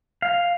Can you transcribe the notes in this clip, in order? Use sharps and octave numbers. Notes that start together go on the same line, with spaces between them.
F5